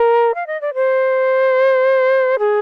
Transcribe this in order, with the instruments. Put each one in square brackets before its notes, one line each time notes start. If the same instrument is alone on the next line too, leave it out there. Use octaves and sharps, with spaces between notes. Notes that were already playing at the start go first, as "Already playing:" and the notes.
Already playing: [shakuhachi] A#4
F5
D#5
D5
C5
G#4